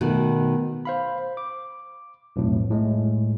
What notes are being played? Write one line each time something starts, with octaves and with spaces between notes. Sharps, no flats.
B2 D#3 A3 B3
C5 F5 B5
D6
B1 F2 A2
A2 G#3